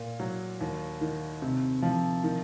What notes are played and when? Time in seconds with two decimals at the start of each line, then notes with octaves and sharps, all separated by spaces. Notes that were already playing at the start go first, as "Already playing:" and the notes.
Already playing: A#2
0.20 F#3
0.61 D#2
1.01 D#3
1.42 C3
1.82 F3
2.24 D#3